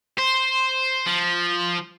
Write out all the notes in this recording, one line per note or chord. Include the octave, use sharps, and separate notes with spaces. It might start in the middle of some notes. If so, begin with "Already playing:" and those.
C5
F3